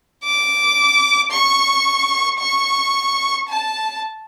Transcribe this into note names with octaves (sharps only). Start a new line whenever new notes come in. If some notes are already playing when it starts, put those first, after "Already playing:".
D6
C#6
C#6
A5